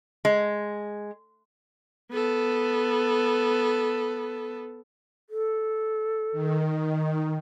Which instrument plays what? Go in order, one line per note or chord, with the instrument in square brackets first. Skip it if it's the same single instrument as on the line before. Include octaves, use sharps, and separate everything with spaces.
[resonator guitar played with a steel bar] G#3
[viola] B3 A4
[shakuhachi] A4
[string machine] D#3